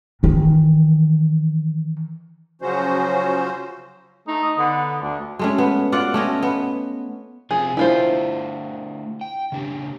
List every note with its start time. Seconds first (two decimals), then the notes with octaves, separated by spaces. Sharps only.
0.23 D#3 E3
2.62 C#3 F3 F#3 C#4 F#4 C5
4.28 A3 D#4
4.42 D#5
4.58 D3 B3
5.02 D2 D4
5.39 G#3 A3 C#4
5.58 B3
5.92 F4 D5 F#5
6.14 A3 C#4 D#5
6.43 B3
7.51 C3 F3 F4 G#4
7.77 A3 D4 E4 F4 G4 C5
9.21 G5
9.52 C#3 D4 G4